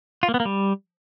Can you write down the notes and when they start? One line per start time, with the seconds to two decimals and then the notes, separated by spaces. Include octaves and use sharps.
0.23 F4
0.29 A#3
0.34 B3
0.40 A#3
0.45 G3